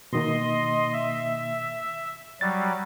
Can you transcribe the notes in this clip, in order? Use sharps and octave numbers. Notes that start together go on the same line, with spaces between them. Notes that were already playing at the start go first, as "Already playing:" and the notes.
B2 D#3 A#3 D#5 C6
E5
F#3 G3 A6